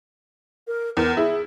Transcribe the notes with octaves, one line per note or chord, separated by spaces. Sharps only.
A#4
E2 A#4
E4 G#4